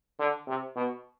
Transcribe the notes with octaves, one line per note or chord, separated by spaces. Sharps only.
D3
C3
B2